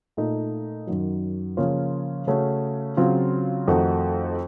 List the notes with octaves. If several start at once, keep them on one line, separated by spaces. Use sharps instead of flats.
A#2 A3 D#4
F#2 D#3 F#3
C#3 F3 A#3 C#4 F4
C#3 A3 C#4 F#4
C#3 F#3 C4 F4
F2 D#3 A3 D#4 F#4